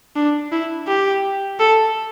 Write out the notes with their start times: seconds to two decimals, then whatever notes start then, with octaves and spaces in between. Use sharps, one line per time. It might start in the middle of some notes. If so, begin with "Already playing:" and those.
0.16 D4
0.52 E4
0.88 G4
1.59 A4